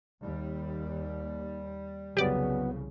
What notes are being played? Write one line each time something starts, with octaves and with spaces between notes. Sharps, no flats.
D#2 G3
C2 F2 C#3 F#3 B3 G4 D5